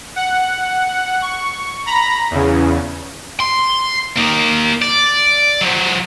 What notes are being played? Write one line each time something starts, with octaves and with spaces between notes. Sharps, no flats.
F#5
C#6
A#5 B5 A#6
E2 C#3
C6
A#3 D#4
D5
F3 F#3